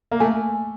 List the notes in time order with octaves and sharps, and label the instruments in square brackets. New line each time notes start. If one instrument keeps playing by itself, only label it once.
[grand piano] A#3
[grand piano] A3 [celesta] G#5